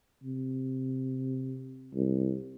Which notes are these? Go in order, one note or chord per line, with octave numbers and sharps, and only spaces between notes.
C3
C2